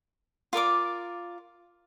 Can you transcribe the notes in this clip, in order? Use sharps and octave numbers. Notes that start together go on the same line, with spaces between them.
F4 A#4 D5 D6